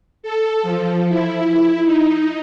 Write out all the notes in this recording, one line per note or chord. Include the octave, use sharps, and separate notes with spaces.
A4
F3
E4
D#4